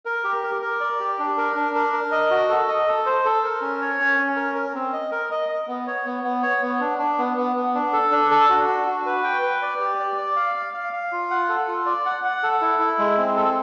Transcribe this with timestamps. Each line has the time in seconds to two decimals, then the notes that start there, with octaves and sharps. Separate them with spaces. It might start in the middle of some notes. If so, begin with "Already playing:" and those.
0.05 A#4
0.24 G4
0.43 A#4
0.62 A#4
0.80 D5
1.00 G4
1.19 D4
1.38 A#4
1.56 D4
1.75 A#4
1.93 A#4
2.11 D#5
2.31 F#4
2.49 A4
2.68 D#5
2.88 A4
3.06 C5
3.25 A4
3.43 A#4
3.62 C#4
3.81 C#5
4.00 C#4
4.19 C#4
4.36 A#4
4.55 A#4
4.75 C4
4.93 D#5
5.12 A#4
5.31 D#5
5.49 D#5
5.67 B3
5.87 C#5
6.05 B3
6.24 B3
6.42 C#5
6.62 B3
6.80 D4
6.99 D4
7.18 B3
7.37 B3
7.56 B3
7.75 D4
7.93 A4
8.11 D4
8.31 A4
8.49 F#4
8.68 D4
8.86 F#4
9.06 B4
9.24 G5
9.42 B4
9.62 D5
9.80 G4
10.00 D5
10.18 D5
10.36 F5
10.55 F5
10.74 F5
10.93 F5
11.12 F4
11.30 F#5
11.49 A4
11.68 F4
11.86 D5
12.06 F#5
12.24 F#5
12.43 A4
12.61 E4
12.79 E4
12.99 G#3
13.17 C4
13.36 A4